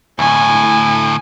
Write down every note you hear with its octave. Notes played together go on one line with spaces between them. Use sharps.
D2 A2 G#5